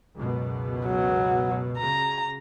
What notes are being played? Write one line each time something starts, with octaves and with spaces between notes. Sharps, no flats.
C#2 F#2 B2
F#3
C#3 A#5